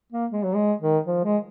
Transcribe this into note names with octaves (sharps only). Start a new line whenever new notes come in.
A#3
G#3
F#3
G#3
D#3
F3
G#3